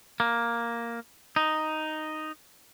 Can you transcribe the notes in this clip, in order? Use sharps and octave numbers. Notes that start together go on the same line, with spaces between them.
A#3
D#4